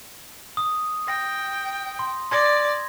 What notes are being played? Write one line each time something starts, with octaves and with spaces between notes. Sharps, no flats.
D#6
G5 A#6
C6
D5 C6 G#6 A#6